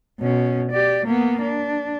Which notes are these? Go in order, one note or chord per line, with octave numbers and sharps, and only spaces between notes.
B2 C#4
G4 D5
A#3 B3
D4